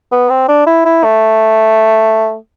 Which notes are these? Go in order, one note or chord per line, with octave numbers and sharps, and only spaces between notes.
B3
C4
D4
E4
E4
A3